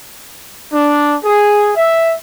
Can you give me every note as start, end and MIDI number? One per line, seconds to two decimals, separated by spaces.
0.72 1.15 62
1.23 1.71 68
1.76 2.15 76